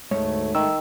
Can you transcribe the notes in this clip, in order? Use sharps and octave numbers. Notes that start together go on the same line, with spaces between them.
D2 G#2 A3 C#5
D#3 A3 E6